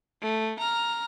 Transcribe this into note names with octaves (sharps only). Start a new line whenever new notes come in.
A3
A#5 F6